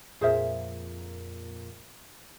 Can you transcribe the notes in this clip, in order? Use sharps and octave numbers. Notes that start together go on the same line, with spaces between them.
F2 A#2 A#3 G#4 C5 E5